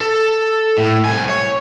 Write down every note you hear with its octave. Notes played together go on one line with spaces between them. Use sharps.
A4
A2
C2 G#5
C#5